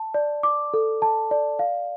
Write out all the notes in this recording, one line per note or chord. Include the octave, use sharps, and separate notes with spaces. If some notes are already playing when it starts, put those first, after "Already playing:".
Already playing: A5
D5
D6
A4
A5
D5
F5